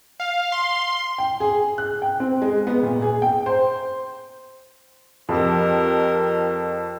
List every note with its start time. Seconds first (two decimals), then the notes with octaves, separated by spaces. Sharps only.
0.20 F5
0.52 C6
1.18 G5
1.40 G#4
1.78 F#6
2.02 G5
2.20 C4
2.42 G#3
2.67 B3
2.83 A#2
3.02 G#4
3.22 G5
3.46 C5
5.29 F2 G4 A#4